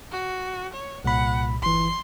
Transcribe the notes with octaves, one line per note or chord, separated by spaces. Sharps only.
F#4
C#5
C2 A#2 F#5 B5
G1 E3 C6